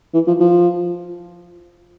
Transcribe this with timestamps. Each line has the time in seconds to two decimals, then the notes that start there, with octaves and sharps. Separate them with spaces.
0.14 E3
0.27 F3
0.40 F3